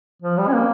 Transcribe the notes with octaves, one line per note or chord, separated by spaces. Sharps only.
F3
G3
C#4
A#3